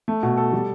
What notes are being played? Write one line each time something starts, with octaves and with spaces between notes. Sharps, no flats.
A3
B2
A4
G3